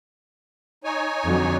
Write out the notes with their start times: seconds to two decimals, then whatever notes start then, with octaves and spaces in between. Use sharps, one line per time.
0.84 D#4 C#5 G#5
1.25 F2 D3 F#3